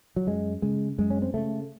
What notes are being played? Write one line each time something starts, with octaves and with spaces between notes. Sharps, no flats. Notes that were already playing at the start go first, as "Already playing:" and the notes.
F#3
F#2 G#3
C#3 G#3
F#2 G#3
C#4
C4
C#3 A3